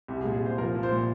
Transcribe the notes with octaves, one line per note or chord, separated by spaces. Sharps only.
C2 G4
G#4
A#2
G#4
C2 C5
F3 A#4
F3
C5
A#2